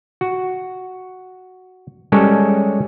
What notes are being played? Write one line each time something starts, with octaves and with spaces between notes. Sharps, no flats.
F#4
G3 G#3 C#4 A4 C#5